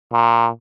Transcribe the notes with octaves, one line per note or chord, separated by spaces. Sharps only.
A#2